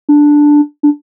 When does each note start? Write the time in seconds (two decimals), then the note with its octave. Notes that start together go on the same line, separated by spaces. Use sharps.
0.09 D4
0.83 D4